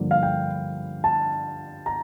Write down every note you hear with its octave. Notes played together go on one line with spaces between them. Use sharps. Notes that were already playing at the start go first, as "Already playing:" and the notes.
Already playing: G2 D3 F3 A#3 D4
F5
G5
A5
A#5